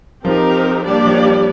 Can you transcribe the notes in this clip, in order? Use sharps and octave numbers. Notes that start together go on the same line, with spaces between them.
F3 C4 D#4 G4 A#4
G3 A#3 D4 G4 D5
F3
G3